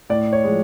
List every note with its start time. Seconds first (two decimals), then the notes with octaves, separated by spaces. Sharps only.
0.10 A2 D5
0.33 C#5
0.44 F3 G#3